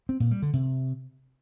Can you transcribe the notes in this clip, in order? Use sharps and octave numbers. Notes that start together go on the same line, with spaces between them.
C4
A#2
G3
D3
C3